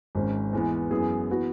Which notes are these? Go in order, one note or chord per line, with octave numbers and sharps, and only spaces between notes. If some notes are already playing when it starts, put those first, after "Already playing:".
G#1 G#2 G#3 C#4
E2 E3 G#3 B3
F#2 E3 B3 G#4
E3 B3 F#4